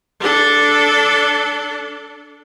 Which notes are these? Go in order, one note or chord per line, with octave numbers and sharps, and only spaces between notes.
D4 A4